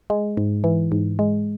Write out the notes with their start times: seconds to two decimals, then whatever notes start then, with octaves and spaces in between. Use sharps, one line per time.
0.10 G#3
0.37 G#2
0.64 E3
0.92 G#2
1.19 G#3